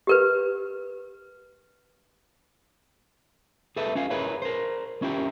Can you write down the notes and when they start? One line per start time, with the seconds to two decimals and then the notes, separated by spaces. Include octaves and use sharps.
0.07 G4 A#4 B4
3.76 G#4 A4 B4 E5
3.95 C#4 F4 G#4 F5
4.10 E4 G#4 A#4 B4 C#5 E5
4.42 A#4 C5
5.02 C#4 E4 F4 G4 A#4